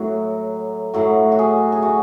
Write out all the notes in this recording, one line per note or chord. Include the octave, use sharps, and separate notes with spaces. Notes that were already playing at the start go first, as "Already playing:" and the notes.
Already playing: A2 F#3 F#4
A2 F#3 F#4
F#4
G#4
G#4
F#4